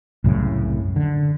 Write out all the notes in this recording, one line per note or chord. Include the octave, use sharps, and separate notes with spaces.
C2 F#2 A2 C#3
D3